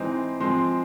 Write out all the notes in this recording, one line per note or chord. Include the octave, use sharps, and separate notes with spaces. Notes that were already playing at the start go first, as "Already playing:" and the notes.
Already playing: E3 G#3 C4 D#4
F3 G#3 C4 C6